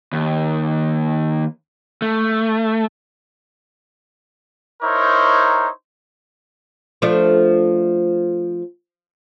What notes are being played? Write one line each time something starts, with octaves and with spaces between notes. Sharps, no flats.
D#2
A3
D#4 E4 A#4 C5 C#5
F3 A3 D4